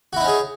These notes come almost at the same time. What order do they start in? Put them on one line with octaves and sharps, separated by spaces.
F#4 E4 D#4 C#4 G#4